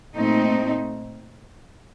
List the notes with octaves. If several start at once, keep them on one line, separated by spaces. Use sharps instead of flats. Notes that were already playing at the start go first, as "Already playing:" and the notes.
A#2 A3 C4 D#4